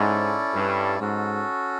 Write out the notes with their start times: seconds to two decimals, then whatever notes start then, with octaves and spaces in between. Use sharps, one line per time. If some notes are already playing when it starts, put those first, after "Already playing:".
Already playing: G#2 C#4 E4 A4 D5
0.53 G2
0.99 G#2 C#4 F#4 A4